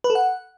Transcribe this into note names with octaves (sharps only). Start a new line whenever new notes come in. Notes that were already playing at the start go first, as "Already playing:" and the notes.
B4
A4
F#5